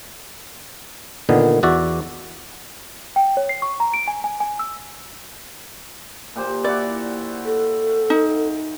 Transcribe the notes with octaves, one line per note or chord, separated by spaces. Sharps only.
A#2 D3 D#3 B3
E2 F#4 D5 E5
G5
C#5
C7
C#6
A#5
D7
G#5
G#5
G#5
E6
A#2 G4 C5
E4 F#4 D5
A4
D#4